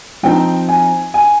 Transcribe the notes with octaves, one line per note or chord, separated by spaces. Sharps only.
F3 C4 D#4 G5
G#5
G#5